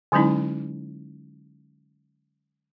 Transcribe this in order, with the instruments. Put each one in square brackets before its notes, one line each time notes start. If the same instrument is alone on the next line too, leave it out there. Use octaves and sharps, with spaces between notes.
[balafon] D3 F#3 G#3 C#4 D#4 E4